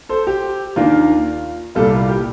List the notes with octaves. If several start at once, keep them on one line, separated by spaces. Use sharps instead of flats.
A4 C5
G4
D#2 D#3 A#3 D4 F4
C2 A#2 G3 F4 A4
F4
G4